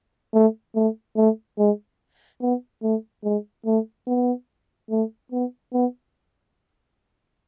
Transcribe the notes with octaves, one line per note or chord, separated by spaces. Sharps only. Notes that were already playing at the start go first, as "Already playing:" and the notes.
A3
A3
A3
G#3
B3
A3
G#3
A3
B3
A3
B3
B3